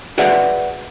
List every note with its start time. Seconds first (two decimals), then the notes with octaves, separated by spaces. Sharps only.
0.18 F#4 G#4 B4 D5 E5 F#5